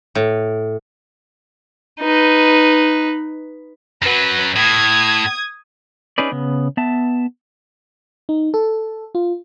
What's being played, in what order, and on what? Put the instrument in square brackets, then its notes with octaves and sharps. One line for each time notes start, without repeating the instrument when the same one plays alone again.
[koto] A2
[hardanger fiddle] D#4 B4
[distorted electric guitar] F#2 F#3 [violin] B4
[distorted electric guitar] A2 [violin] D#6 G#6
[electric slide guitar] C#4 D#4 G#4 B4 D5
C#3 B3
B3 E5 A5
[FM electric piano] D#4
A4
F4